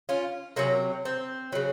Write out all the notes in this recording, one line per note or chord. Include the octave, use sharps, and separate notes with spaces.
C#4 F4
C3 F#3 A#3 C#4
C4
C#3 F#3